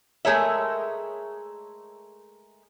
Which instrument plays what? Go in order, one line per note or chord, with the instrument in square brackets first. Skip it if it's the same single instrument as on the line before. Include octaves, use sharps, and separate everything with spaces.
[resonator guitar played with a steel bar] G#3 A3 G#4 A#4 C#5 E5